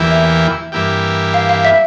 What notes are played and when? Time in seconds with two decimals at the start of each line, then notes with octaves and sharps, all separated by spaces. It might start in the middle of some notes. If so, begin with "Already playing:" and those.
Already playing: E2 E3 A#3 E4 G4
0.11 E5
0.72 G2 E3 A#3 E4 G4
1.34 F5
1.49 F5
1.65 E5